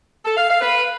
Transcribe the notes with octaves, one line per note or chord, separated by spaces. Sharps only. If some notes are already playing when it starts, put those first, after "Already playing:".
A4
F5
F5
B4